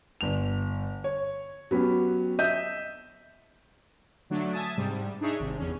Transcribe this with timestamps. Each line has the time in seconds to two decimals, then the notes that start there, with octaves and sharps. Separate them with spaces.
0.21 G1 F7
1.04 C#5
1.71 F#3 B3 C#4 G4
2.39 D#5 E5 G6 D#7
4.30 D3 F#3 A3 D4
4.52 E5 G#5 A5 D#6 A6
4.77 G#2 C3 G3
5.21 D4 D#4 G#4 C#5 E5
5.39 G#1 C3
5.57 E2 C#4